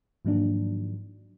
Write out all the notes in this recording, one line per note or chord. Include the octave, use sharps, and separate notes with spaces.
G#2 D#3 F3 F#3 A#3 D4